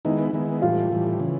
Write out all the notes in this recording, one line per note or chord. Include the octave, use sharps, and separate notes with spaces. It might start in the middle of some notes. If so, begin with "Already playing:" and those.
D#3 G#3 B3 D#4 E4
D#3 G#3 B3 E4
A2 E3 G3 F4
A2 E3 G3
C#3 E3